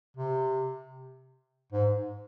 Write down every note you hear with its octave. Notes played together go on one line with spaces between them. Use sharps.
C3
G#2